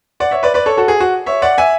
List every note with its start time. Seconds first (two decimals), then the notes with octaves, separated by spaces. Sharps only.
0.20 D5 F#5
0.31 C#5 E5
0.43 B4 D5
0.54 B4 D5
0.66 A4 C#5
0.77 F#4 A4
0.88 G#4
1.00 F#4
1.26 C#5 E5
1.42 D5 F#5
1.58 E5 G#5